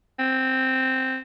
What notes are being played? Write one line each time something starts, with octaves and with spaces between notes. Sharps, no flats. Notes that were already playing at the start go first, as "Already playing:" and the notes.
C4